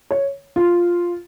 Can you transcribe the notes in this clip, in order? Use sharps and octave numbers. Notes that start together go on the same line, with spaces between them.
C#5
F4